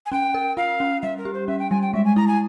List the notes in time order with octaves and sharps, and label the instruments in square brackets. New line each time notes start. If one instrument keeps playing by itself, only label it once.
[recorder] G#5
[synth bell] C#4 [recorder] G5
[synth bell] A#4
[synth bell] F4 [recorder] F5
[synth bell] C#4
[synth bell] G3 [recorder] E5
[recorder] A#4
[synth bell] G4
[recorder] C5
[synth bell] C#4 [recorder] E5
[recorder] G5
[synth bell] G3 [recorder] G#5
[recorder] G5
[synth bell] G#3 [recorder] E5
[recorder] G#5
[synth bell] E4 [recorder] A#5
[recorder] G#5